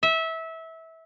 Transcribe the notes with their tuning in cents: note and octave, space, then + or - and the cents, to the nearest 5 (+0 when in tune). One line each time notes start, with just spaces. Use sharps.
E5 -20